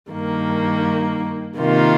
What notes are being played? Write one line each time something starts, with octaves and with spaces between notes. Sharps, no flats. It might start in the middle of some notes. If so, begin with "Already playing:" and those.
G2 D#3 A#3
C3 D#3 A#3 F4